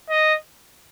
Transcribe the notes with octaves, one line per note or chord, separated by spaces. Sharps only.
D#5